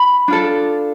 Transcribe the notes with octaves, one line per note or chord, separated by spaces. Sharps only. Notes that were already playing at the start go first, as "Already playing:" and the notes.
Already playing: B5
D4 F4 A4